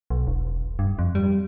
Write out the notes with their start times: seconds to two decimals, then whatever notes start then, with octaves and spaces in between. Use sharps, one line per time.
0.10 B1
0.27 E1
0.79 G2
0.99 F2
1.15 G3